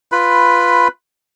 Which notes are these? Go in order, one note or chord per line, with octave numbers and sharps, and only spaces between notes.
F4 B4 B5